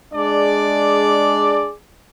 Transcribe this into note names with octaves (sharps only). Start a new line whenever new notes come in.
G#3 D4 G#4 D5